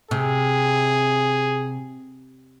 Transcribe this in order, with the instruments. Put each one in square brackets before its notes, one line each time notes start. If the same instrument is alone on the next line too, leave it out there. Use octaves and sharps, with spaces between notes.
[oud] C3 [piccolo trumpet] G#4